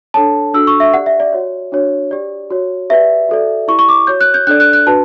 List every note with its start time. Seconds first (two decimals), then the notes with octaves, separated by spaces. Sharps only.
0.14 D4 A4 C#5 A5
0.54 D4 F#4 A4 E6
0.67 C#6
0.80 E5
0.93 G4 D5 F#5
1.06 E5
1.20 D5
1.33 F#4 C#5
1.72 D4 F#4 C#5
2.11 G4 D5
2.50 F#4 C#5
2.90 G4 B4 D5 E5
3.29 F#4 A4 D5
3.68 E4 G4 D5 C#6
3.79 C#6
3.89 D6
4.07 F#4 C#5 G6
4.21 F#6
4.34 G6
4.47 D4 A4 D5 F#6
4.60 F#6
4.73 F#6
4.86 D4 F#4 B4 A5